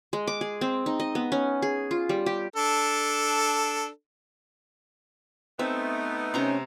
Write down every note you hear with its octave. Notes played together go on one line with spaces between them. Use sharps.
G#3
D6
G#4
C4
D#4
D#5
B3
C#4
G#4
F4
G3
G4
D4 A4
A3 B3 C4 D#4 E5
C3 C#4 A#5 C6